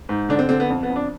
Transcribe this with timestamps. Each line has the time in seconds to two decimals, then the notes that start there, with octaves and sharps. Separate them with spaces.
0.09 G#2
0.29 D3 D4
0.39 C4
0.49 D3 C4
0.60 B3
0.70 F2
0.83 B3
0.89 F2
0.96 D4